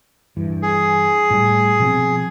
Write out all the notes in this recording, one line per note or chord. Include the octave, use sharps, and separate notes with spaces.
G2 E3
G#4
A2 G3
B2 F3 C4